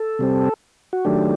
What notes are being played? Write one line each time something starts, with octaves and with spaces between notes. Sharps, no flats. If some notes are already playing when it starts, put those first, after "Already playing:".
Already playing: A4
C3 G3 C4
F#4
D#3 F#3 A3 D4 G4